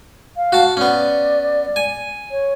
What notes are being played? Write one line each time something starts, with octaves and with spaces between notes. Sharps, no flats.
F5
F#4 A5
B3 C#4 D5
G#5
C#5